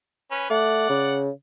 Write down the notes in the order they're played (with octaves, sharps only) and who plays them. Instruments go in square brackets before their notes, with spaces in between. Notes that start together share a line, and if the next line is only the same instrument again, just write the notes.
[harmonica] C#4 B4
[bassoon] A3 [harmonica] D5 F#5
[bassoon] C#3